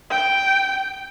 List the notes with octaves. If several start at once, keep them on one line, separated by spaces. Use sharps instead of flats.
G5